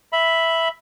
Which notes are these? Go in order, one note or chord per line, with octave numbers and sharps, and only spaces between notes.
E5 B5